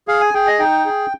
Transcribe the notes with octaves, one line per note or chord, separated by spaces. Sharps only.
G#4 F5
G#5
G#4 G5
D#5
D#4 G5
G#4